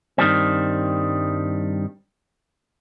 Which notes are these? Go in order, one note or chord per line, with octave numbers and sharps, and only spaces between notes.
G2 D#3 G3 C4